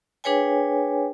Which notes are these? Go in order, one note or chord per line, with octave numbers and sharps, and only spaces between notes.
D4 G#4 B4 C#5 G5 G#5